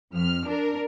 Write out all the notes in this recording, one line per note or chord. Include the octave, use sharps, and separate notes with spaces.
F2 F6
D4 A#4